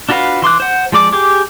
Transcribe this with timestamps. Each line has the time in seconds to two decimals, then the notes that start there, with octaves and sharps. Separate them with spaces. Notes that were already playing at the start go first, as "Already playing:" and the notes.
0.09 D4 F4 F#4 B4 F5
0.42 E3 C6 D6 F#6
0.60 C5 F#5
0.92 F3 G#3 D5 D6
1.13 G4 G#4 D6